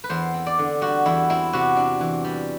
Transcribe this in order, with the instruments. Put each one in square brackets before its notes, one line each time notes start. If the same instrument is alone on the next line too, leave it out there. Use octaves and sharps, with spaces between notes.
[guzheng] B4
E2 C5
C4
D5
D3
G3 F#4
E2 E4
C4 E4
C3 F#4
D4
E3
G3